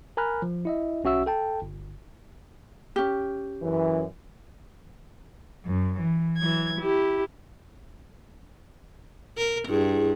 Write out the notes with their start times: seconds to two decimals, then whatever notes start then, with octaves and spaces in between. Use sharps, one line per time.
0.17 A#4 G#5 A#5 B5 F6 F#6
0.42 F3
0.65 E4 D#5 E5
1.04 B1 C#4 F#4 E5 E6
1.26 A4 G5 A5
1.62 G1
2.96 C#4 G4
3.63 F#2 E3
5.65 F#2
5.99 E3
6.37 E3 F#3 G#6
6.78 E4 G4
9.37 A#4
9.69 G2 E4 G#4